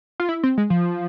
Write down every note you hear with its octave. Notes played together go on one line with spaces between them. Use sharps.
F4
E4
C4
G#3
F3